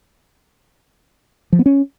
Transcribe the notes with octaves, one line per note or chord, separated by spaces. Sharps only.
F3
B3
C#4